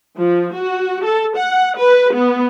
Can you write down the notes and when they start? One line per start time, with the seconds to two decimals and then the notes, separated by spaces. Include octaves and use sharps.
0.18 F3
0.55 F#4
1.05 A4
1.37 F#5
1.77 B4
2.15 B3